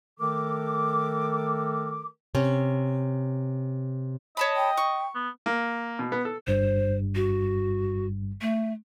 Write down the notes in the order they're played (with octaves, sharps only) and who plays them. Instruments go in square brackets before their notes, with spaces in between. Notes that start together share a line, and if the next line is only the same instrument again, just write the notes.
[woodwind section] D#3 A3 A4 A#4 D6
[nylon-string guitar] C3 C#4
[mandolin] C#5 A5 B5 [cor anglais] D#5
[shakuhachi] G5
[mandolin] C#6
[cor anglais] B3
[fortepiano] A#3
B2
B3
A4
[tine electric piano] G1 G2 G3 [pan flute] C5
[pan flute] F#4
A3